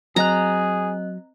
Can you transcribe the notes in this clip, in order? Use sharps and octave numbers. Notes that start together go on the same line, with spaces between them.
F#3 C4 G#4 D#5 A#5 F#6